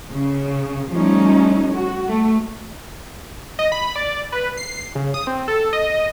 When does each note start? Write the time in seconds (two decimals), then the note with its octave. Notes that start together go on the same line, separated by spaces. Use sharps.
0.11 C#3
0.92 F3 G3 A3 C#4 D#4
1.75 F#4
2.07 A3
3.59 D#5
3.72 B5
3.96 D5
4.32 B4
4.57 C7
4.95 C#3
5.14 D#6
5.27 C4
5.48 A4
5.73 D#5